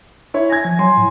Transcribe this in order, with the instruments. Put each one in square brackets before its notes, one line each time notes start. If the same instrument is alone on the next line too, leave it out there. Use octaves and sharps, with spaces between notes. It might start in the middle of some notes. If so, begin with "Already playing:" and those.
[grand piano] E4 C#5
[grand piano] G#5 G#6 [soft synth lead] A#6
[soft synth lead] F3
[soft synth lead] F#3 [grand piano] G#5 C6
[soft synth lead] A2